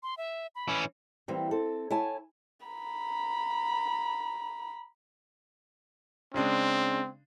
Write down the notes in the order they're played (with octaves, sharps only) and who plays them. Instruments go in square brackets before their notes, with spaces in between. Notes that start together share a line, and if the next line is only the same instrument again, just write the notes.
[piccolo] C6
E5
B5
[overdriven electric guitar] E3 C#4
[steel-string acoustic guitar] E3 G3 A#3 C4 G4
C4 A4
E4 C#5 G#5 A5
[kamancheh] A#5 B5
[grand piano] C#3 G#3 D4 [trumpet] C4